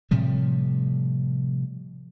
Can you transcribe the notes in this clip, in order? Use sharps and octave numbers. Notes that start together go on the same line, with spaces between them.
A2 C3 F3 G3